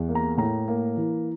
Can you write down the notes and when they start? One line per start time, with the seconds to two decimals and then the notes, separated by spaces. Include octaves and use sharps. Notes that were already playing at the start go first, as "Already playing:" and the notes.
Already playing: E2
0.09 A#3
0.15 A#5
0.37 A2 A#5
0.68 A#3
0.97 E3